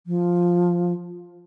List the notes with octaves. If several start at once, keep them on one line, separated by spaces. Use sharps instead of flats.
F3